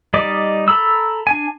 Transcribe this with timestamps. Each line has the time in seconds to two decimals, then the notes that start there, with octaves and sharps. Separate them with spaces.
0.14 G3 D#4 D5 D#5 D6
0.68 A4 A#5 B5 E6
1.27 D4 G#5